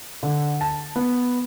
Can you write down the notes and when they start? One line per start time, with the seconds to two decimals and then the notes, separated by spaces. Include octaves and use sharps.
0.23 D3
0.61 A5
0.96 B3